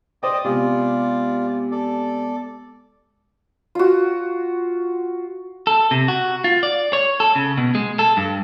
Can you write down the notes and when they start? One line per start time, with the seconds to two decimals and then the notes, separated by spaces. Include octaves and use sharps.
0.23 C5 D5 D#5 G5
0.44 C3 G#3 B3 F4 D5
1.72 A4 D5
3.75 F4 F#4
5.67 A4
5.91 C3
6.08 F#4
6.44 F4
6.63 D5
6.93 C#5
7.20 A4
7.36 C#3
7.57 B2
7.75 G#3
7.99 A4
8.17 G2